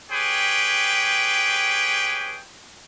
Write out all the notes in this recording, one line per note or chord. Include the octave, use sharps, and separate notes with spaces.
G4 G#4 B4 C#5 G5